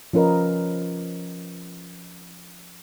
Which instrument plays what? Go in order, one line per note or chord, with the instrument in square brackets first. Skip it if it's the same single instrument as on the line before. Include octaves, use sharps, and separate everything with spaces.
[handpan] F3 C#4 F4 A#4 B4 D#5